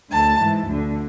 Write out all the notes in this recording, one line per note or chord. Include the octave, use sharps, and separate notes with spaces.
D2 D3 A5
G#2 E3
D2 D3